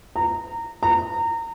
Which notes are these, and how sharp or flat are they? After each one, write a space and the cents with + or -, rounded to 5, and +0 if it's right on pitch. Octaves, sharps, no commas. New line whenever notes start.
A#5 -20
A#5 -25